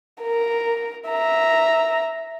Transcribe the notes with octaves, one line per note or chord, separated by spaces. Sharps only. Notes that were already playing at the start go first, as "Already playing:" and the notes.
A#4
E5 A#5